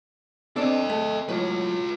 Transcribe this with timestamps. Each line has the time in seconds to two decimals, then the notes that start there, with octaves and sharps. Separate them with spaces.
0.56 C4 D4 A4 D#5
0.90 A3
1.29 A2 F#3 F4 B4